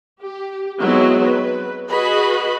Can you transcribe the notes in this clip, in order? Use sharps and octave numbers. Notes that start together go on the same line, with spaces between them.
G4
F#3 G#3 B3 C4 D#4 E4
B4
F#4 G#4 B4 D#5 B5